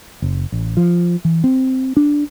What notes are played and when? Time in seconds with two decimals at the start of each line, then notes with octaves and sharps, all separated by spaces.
0.22 F#1
0.52 A1
0.77 F3
1.25 E3
1.44 C4
1.97 D4